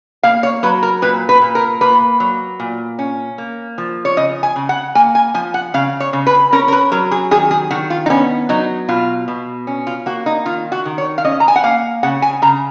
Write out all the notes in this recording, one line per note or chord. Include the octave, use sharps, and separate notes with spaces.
A#3 F5
C#5
F#3 B4
A#4
A#2 B4
B4
A#2
A#4
A#3 B4
F#3
A#2
C#4
A#3
F3
C#5
C#3 D#5
G#5
C#3
F#5
A#3 G#5
G#5
F3 G#5
F#5
C#3 F5
C#5
C#3
B4
C#4 A#4
A#4
B4
F#3 A#4
G#4
D#3 G#4
G#4
D#3 F#4
F4
D#4
B3 C#4
F#3 D#4
B2 F4
B2
C#4
F4
A#3 F#4
D#4
D#3 F4
F#4
D#3
C#5
F5
C#4 D#5
A#5
G#5
F#5
A#3 F5
C#3 F#5
G#5
C#3 A#5